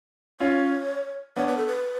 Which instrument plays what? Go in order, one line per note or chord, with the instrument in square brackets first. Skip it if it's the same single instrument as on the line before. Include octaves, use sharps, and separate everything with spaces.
[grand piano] C#4 F4 [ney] C#5
[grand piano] B3 D4 [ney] C#5
[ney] B4
A4
B4